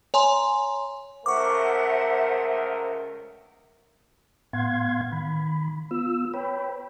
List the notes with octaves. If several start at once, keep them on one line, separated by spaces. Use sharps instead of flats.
C#5 G#5 A#5 C6
C#2 A3 A#4 C5 E5 F#5 C#6 D6
A2 B3 F5 F#5 C6 G#6
D#3 B5
B3 F4 E6
B4 C#5 G5 B5